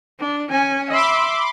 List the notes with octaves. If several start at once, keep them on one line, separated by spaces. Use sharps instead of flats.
D4
C#4 G#5
E5 B5 C6 D6